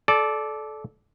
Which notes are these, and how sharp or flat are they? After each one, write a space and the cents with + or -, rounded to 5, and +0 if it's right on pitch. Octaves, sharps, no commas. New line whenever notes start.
A4 -20 D5 +0